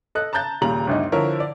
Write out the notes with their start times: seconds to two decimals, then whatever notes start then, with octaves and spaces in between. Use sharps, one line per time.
0.15 A4 D#5 F#6
0.33 A5 A#5 F#6 G6 A6
0.61 D#1 A#2 C#3 G3 A#5 F#7
0.87 G1 D2 D#4
1.12 D3 F3 E4 A#4 C#5
1.40 D5